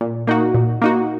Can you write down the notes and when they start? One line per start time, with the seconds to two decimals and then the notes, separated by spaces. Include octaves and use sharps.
0.01 A#2
0.27 A#3 D#4 F#4
0.54 A#2
0.82 A#3 D#4 F#4